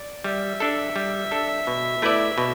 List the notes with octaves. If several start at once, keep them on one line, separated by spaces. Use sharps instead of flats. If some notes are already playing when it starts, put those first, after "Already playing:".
Already playing: D5
G3 E5
D4 A4
G3
D4 A4
B2
A3 E4 B4 D5
B2